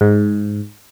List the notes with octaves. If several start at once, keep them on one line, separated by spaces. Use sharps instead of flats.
G#2